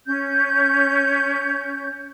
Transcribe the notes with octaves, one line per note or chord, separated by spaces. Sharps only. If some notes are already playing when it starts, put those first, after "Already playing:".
C#4 G6